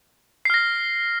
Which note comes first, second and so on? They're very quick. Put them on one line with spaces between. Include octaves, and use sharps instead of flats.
C7 F6 A#6